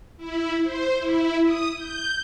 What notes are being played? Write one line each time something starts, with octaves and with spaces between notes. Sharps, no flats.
E4
C5
E4
D#6
G6